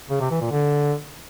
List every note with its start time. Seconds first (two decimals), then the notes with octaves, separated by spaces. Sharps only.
0.10 C#3
0.21 C3
0.31 E3
0.41 A#2
0.51 D3